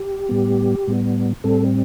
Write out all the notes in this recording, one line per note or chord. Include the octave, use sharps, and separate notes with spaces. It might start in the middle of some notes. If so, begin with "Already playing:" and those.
Already playing: G4
A2 G3 B3
A2 G3 B3
A2 G3 C4 A4